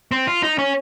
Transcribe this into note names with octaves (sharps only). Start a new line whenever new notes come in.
C4
F4
D#4
C#4